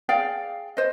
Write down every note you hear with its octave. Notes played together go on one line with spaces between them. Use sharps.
G#4 D5 F5 G5
C5 D#5